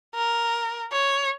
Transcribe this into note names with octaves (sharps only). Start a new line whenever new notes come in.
A#4
C#5